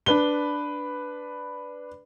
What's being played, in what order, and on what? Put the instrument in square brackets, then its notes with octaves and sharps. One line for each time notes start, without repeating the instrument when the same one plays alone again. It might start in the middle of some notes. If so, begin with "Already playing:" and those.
[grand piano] D4 B4 G7